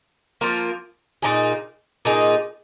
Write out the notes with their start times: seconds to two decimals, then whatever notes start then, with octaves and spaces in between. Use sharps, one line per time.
0.41 F3 A#3 F4 A#4
1.22 A#2 A#3 D#4 G#4
2.05 A#2 A#3 D#4 G#4